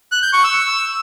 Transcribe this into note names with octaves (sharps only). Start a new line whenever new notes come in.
F#6
G6
C#6
E6